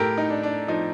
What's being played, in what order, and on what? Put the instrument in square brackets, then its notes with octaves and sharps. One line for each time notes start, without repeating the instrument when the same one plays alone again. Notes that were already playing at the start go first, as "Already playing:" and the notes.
Already playing: [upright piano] A2 G4 A4 A#4
D#4
D4
D4
F3 D#4